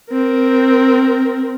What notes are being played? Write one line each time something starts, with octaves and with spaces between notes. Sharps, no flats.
C4 A#4